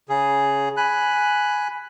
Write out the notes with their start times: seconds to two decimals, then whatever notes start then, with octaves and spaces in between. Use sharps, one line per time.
0.09 C#3 G#4
0.77 G#5 B5 F#6